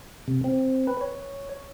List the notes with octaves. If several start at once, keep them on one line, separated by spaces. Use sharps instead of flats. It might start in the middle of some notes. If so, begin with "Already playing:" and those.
C3
C4
B4
C#5